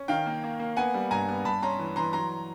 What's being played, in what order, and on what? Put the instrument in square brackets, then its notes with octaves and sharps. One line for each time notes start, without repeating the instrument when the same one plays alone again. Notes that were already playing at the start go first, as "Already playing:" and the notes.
Already playing: [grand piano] C#4
D#3 F5 G5
A#3
A#3
A#3
B3 F#5 G#5
G3
G2 G#5 A#5
B3
G2 A5 B5
C#4 A#5 C6
E3
E3 A#5 C6
F#3 A#5 C6